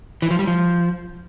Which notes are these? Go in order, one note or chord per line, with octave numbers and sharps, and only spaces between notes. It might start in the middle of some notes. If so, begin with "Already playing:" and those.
E3
F3
G3
F3